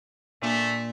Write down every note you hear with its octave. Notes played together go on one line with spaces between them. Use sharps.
A#2 A3 D4